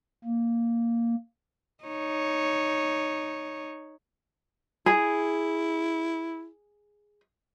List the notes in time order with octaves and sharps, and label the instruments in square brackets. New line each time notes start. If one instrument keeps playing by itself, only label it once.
[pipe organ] A#3
[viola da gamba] D#4 C#5
[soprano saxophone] E4 [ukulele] G#4